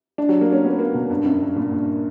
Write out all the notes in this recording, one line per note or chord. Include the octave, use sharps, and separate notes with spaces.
D4
F#3
A#3
C#4
B3
A#3
B2
G2
F#2
G2
A#2
G2